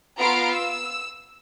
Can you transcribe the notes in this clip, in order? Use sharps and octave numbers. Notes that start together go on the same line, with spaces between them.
B3 F4 F5 A#5 D7
E6